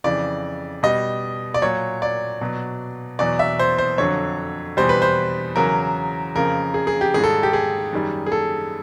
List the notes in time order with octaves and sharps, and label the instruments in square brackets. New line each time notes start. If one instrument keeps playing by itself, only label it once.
[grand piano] F2 C#3 E3 D5
B2 G3 D#5
D5
A#2 F#3 C#5
D5
B2 F#3
E2 B2 F#3 D5
E5
C5
C5
F2 D3 F#3 C#5
E2 B2 G3 C5
B4
C5
E2 C#3 F#3 A#4
F2 C#3 F3 A#4
G#4
G#4
G4
G#2 D#3 G3 G#4
A4
G4
G#4
F#2 D#3 G3
G#4
A4